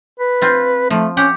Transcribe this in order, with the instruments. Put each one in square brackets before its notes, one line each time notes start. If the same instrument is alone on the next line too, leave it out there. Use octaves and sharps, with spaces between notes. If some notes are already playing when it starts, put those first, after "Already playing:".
[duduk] B4
[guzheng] C4 F4
[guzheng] F3 [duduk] A3
[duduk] C#4 [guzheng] G4 F#5 G5